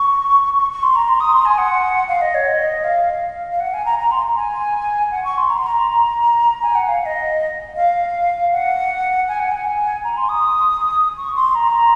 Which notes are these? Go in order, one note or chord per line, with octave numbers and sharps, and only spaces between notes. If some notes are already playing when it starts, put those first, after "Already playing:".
Already playing: C#6
C#6
C#6
C6
A#5
C6
D#6
C6
G#5
F#5
F5
D#5
C#5
D#5
F5
F5
F#5
G#5
A#5
A#5
C6
G#5
F#5
C#6
C6
A#5
C6
A#5
G#5
F#5
F5
F5
D#5
F5
F#5
G#5
F#5
G#5
A#5
C6
D#6
C#6
C6
A#5